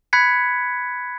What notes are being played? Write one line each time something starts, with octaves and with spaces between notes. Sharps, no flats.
B5 F#6 G#6 B6 C#7